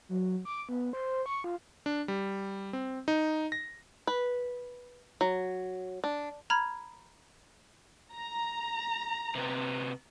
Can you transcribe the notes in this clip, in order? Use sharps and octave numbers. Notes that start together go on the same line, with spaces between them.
F#3
D6
B3
C5
C#6
F4
D4
G3
C4
D#4
A#6
B4
F#3
D4
A#5 B5 F6 G#6
A#5
C3 B3